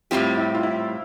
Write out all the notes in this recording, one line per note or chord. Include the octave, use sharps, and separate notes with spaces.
A2 G3 C4 F4 G4
E4
F4
E4